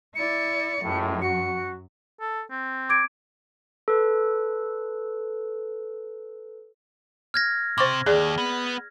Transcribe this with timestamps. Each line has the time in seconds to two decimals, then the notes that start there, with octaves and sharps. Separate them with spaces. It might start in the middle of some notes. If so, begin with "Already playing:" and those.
0.15 E4 D5 C#7
0.82 C#2 F#2 A2 F#3
1.22 F#4 C#7
2.21 A4
2.51 C4
2.89 D6 G#6 D7
3.88 A4 B4
7.34 F6 G#6 A#6
7.78 C3 C5 C#6 D6
8.06 D#2 G#4 D5
8.38 B3